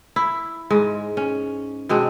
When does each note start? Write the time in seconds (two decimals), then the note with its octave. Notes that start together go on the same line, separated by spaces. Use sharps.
0.16 E4
0.71 G#2 G#3
1.17 C#4
1.89 B2 G#3 C4 D4